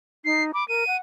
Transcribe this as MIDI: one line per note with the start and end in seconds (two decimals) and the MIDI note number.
0.25 0.51 63
0.25 0.43 96
0.54 0.64 83
0.54 0.66 86
0.68 0.84 70
0.68 0.96 99
0.87 0.98 78